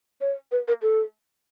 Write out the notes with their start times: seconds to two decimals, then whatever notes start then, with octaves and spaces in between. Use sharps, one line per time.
0.21 C#5
0.52 B4
0.68 A#4
0.82 A4